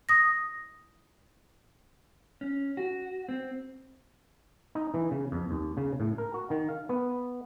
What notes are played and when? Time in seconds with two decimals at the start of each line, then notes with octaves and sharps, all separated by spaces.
0.09 D#6 A#6
2.41 C#4
2.77 F#4
3.29 C4
4.75 D#4
4.94 E3
5.11 C#3
5.32 F2
5.51 D#2
5.77 C#3
6.00 A2
6.18 A#4
6.34 F#4
6.50 D#3
6.69 F5
6.89 B3